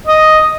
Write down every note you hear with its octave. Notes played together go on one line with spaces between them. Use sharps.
D#5